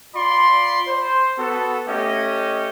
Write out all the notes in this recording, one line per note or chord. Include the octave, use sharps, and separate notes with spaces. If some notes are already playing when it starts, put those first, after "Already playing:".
F4 D5 B5 C6
C5
B3 F#4 A4
A3 C#4 G4 D#5